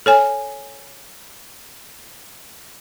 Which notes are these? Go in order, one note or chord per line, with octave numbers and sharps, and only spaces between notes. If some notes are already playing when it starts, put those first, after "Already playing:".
A4 C#5 G#5